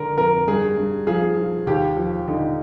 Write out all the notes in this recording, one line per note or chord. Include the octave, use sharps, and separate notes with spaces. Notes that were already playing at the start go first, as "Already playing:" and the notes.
Already playing: D3 A#4
F2 A#4
G2 G#4
G2
F3 G#4
F3
D#2 G4
F3
D3 D#4